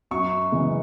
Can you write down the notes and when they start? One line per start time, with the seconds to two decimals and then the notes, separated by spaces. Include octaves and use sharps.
0.11 F#2 C#6
0.52 C#3 E3 G#3